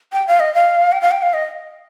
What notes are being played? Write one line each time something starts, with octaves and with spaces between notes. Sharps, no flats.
G5
F5
D#5
F5
G5
F5
G5
F5
D#5